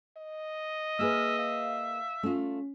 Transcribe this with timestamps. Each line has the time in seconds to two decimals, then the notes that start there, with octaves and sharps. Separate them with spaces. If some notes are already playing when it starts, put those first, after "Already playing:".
0.18 D#5
0.99 A#3 G#4 B4 E5 F6
1.38 E5 F5
2.23 A3 C#4 F4